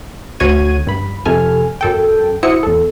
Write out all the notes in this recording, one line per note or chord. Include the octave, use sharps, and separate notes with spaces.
D2 F#4 C#5 G#6 D#7
G2 B5
F2 C3 A4 G#5 F6
F#2 A4 G5
E4 F#4 C5 E5 D#6 C#7
E2 A4